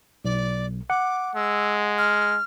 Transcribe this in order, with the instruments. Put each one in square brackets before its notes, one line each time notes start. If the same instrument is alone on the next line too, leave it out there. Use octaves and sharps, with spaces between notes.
[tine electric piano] B1 [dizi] D5
[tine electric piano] F#5 [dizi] D6
[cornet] G#3 [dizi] E6
[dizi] F6